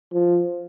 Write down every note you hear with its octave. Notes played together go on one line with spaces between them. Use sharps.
F3